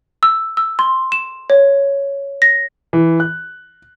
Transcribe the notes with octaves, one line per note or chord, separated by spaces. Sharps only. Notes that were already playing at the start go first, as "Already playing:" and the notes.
E6
E6
C6
E7
C#5
A#6
E3
F#6